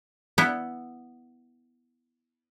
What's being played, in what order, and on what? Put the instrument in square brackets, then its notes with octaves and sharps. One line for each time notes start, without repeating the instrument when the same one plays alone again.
[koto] B3 E4